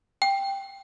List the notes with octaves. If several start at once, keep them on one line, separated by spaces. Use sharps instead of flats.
G5